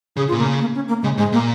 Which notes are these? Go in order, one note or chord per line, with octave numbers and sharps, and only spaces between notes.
C#3 G#4
F4
A#2
C#3 A#3
A#3
C#4
A#3
C#3 G#3
G#2 G#3
A#2 A#3